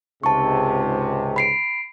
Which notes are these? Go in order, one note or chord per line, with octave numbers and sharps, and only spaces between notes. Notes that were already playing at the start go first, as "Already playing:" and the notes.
C#2 G#2 C3 A5 C#6
B5 C7 D7